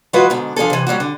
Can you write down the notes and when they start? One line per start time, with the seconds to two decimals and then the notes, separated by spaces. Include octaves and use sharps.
0.13 E3 F#3 G#3 F4 F#4 B4
0.30 G#2 B2 D3
0.56 F3 D4 G#4 A4
0.70 C3 E3
0.87 F#3 G3 A#3 F#4
1.00 D3